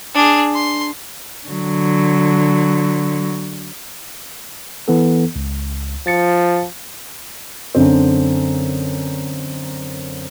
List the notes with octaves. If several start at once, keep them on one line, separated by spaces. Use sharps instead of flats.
D4 G#4
C6
D3 F#3
E3 B3 A4
C#2
F3 A6 C#7
F#2 D3 C4